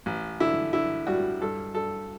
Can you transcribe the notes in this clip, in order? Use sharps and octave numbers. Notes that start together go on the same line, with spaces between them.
A1
D3 E4
D3 E4
G3 F#4
G2 A4
G2 A4